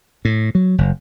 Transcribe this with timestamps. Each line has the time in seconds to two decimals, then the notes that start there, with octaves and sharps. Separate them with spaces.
0.25 A2
0.55 F#3
0.78 F#1